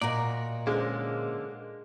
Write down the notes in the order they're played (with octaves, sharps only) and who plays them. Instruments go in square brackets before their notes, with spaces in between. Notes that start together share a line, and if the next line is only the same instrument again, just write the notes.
[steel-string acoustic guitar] A#2 F#4 [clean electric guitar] A#4 D5 [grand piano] D#5 A#5
[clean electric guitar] D3 A#3 [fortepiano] G#3 [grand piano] C#4 C5